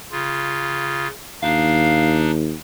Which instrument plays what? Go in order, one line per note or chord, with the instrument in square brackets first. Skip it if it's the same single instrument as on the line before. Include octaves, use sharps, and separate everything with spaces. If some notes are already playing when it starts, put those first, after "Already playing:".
[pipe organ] C#3 F4
[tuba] D#2 [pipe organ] D4 D#4 [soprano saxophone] F5